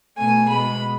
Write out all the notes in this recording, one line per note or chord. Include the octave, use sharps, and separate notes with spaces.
B2 A3 G#5
B2 G#3 B3 B5